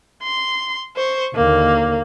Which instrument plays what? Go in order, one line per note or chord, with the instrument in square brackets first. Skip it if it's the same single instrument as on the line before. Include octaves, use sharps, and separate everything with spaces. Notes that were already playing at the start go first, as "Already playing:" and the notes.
[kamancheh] C6
C5 C#6
[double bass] D#2 D3 [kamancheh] A#3